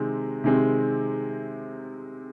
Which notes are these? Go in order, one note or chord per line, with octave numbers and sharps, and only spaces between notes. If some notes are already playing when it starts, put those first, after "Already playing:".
Already playing: C3 D#3 G#3 C4
C3 D#3 G#3 C4